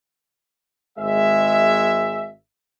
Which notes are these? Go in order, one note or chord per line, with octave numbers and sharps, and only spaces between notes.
G#1 G#3 E5